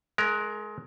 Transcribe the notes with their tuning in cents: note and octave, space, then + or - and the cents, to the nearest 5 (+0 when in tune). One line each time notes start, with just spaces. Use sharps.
G#3 +25 A#4 +0